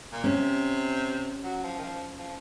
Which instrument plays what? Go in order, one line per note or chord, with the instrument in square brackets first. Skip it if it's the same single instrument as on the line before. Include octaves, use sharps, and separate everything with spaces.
[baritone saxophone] A#2
[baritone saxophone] C3 [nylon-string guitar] C#4
[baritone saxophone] F#3
F3
D#3
F3
F3